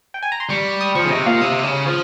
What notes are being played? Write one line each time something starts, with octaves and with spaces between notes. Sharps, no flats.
G5
G#5
A#5
C6
G3 C#6
D#6
F3 C#6
C#3
C3 D#5
A#2 F5
C3 D#6
C#3
F3